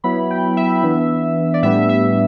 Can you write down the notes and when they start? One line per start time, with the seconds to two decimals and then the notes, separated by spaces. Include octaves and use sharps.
0.04 F#3 B3 E4 B5
0.30 G5
0.57 E5
0.83 E3 B3 D4
1.54 D5
1.63 A2 G3 B3 D4 E5
1.89 E5